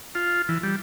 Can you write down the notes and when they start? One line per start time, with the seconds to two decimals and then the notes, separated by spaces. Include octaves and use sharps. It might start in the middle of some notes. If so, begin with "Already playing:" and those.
0.15 F4
0.49 E3
0.63 G3